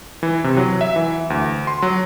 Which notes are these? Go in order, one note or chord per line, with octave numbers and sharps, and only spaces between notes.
E3
C3
F#3
E5
E3
D2
C6
F#3